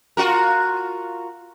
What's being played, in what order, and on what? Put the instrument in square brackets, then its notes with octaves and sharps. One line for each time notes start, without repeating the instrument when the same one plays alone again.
[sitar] F4 F#4 A#4